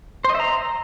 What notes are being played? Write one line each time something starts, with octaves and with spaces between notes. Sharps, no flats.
C5
D#5
E5
A#5